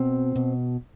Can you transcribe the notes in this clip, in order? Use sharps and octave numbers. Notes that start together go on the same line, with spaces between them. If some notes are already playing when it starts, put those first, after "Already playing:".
Already playing: B2 C4
B2